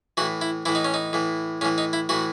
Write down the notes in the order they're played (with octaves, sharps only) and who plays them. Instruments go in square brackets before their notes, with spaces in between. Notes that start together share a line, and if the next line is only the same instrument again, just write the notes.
[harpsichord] E3 F#4
A2
E4
A2 E3 E4
D#4
C#4
D#4
A2 E3
A2 C#4
E3
D#4
E4
A2 E3 F#4